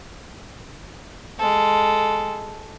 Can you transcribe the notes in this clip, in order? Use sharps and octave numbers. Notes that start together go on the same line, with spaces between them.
G#3 A4